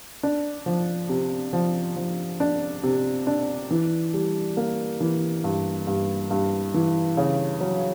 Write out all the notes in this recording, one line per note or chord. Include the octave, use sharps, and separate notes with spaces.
D4
F3
C3
F3
F3
D4
C3
D4
E3
G3
A#3
E3
G2
G2
G2
E3
C#3
F#3